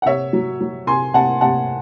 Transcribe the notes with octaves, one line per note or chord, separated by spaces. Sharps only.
F#5
C3 C#5 E5
F#3
F#3
C3 G#5 C6
C3 F#5 A5
C3 F#5 A5